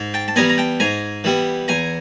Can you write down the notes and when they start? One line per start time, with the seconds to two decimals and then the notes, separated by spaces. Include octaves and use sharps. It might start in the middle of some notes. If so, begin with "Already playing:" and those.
Already playing: G#2
0.14 G5 A5
0.28 A5
0.36 E3 G3 B3 G#5 A#5
0.49 A#5
0.58 G5 A5
0.80 G#2 G#5 A#5
1.24 E3 G3 B3
1.68 E2 G#5 A#5